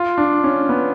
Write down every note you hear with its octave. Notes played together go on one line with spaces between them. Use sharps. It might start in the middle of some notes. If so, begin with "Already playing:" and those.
Already playing: F4
D4
C#4
B3